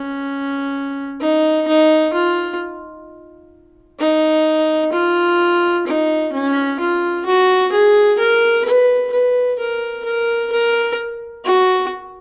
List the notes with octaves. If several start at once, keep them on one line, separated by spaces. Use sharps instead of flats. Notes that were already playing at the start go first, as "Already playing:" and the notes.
Already playing: C#4
D#4
D#4
F4
D#4
F4
D#4
C#4
F4
F#4
G#4
A#4
B4
B4
A#4
A#4
A#4
F#4